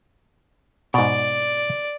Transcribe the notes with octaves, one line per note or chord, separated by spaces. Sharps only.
G#2 B2 D5